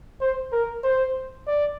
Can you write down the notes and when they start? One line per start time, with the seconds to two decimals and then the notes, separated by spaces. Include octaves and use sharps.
0.21 C5
0.52 A#4
0.84 C5
1.47 D5